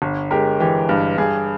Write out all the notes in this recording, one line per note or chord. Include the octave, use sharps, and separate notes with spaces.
G1
G#3 G4 A#4
E3 G4
G2
G2 G#4